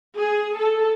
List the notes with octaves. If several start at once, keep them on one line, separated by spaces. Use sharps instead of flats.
G#4
A4